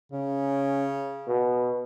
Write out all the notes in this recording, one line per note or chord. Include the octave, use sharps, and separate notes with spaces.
C#3 C#4
B2